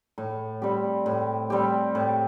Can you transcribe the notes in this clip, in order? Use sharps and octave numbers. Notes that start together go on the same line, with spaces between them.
A2
G3 C4 G4
A2
G3 C4 G4
A2